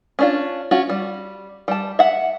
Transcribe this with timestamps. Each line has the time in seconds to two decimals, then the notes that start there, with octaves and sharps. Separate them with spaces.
0.19 C#4 D4 F4
0.71 C#4 F4 F#4
0.89 G3
1.68 G3 A5
1.99 E5 F#5